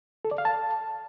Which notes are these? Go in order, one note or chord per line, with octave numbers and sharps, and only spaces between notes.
A4
D5
F5
A5